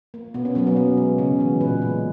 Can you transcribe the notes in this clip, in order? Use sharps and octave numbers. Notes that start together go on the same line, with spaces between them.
A#3
B2 B3
C#4
F#3 A#3 B3
B3
B2 C#4
G#3
C#3 C#4
E3 G#3
A#2 B4
G#3